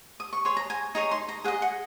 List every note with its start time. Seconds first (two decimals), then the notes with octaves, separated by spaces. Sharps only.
0.20 D#6
0.33 C#6
0.45 G#4 C#5 C6
0.57 A#5
0.70 G#5
0.95 D#4 G#4 C#5 A#5
1.11 C6
1.29 A#5
1.44 G#4 D#5 F#5
1.62 F#5